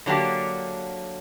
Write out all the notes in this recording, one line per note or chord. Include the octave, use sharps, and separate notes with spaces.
D3 F#3 A#3 D4 G4